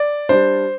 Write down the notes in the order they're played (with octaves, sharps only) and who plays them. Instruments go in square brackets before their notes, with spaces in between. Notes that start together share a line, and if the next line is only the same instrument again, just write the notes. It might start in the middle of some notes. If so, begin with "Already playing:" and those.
Already playing: [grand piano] D5
G3 D4 C5